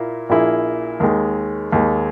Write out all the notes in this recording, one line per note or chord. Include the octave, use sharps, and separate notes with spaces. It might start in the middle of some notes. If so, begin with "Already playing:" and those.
Already playing: A#2 A#3 E4
A#1 A#2 A#3 E4 G#4
D#2 D#3 G#3
D#2 D#3 G#3